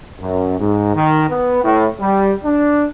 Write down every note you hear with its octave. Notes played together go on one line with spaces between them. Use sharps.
F#2
G#2
D#3
B3
A2
G3
D4